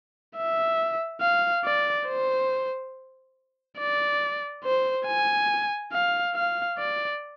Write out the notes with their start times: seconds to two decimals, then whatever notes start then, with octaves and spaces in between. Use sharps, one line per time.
0.36 E5
1.21 F5
1.65 D5
2.07 C5
3.79 D5
4.65 C5
5.07 G#5
5.93 F5
6.35 F5
6.78 D5